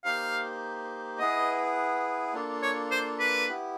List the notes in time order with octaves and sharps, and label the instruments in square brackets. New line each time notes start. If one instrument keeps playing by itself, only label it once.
[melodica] A#3 D#4 G4 C5 [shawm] F5
[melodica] B3 E4 G#4 B4 [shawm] D#5
[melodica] A#3 D4 F4 A4
[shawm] C#5
C5
B4
[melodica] B3 E4 G4